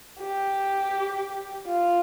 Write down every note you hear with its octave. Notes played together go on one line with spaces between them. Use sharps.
G4
F4